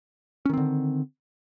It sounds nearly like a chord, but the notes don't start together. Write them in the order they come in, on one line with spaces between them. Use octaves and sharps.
C#4 D#3 C4 D3